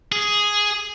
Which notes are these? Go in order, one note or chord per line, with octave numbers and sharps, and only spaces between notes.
G#4